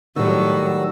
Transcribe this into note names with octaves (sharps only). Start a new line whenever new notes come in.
A2 D#3 F#3 G3 F#4 E6